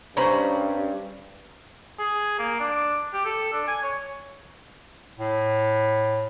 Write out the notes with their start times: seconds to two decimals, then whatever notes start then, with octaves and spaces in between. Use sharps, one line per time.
0.17 G2 C#4 C5 A#5 B5
1.99 G#4
2.39 A#3
2.60 D4
3.13 G4
3.25 A4
3.52 D4
3.68 G#5
3.83 C#5
5.19 A2